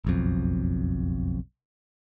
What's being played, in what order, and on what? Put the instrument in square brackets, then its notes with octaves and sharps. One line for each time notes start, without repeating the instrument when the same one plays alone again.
[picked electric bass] F#1 B1 F2